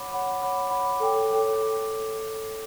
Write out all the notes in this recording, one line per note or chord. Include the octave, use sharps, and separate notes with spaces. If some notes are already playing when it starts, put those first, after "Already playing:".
Already playing: C#5 F#5 B5 D6
C#5 F#5 B5 D6
C#5 F#5 B5 D6
C#5 F#5 B5 D6
A4 C#5 G5 D6
A4 C#5 G5 D6